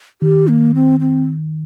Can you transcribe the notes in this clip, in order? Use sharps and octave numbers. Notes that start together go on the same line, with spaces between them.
D#3 G4
A#3
C4
C4